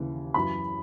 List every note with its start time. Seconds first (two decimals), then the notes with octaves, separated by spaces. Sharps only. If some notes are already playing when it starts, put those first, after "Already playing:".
Already playing: D#2 C#3 E3
0.34 F#2 E3 B5